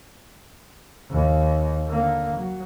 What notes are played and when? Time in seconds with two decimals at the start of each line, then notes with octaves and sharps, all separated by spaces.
1.10 D#2
1.88 D3 A#3
2.35 F#3